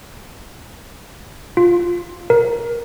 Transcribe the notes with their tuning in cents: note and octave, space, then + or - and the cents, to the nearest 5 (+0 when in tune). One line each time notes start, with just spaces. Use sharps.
F4 +5
A#4 +15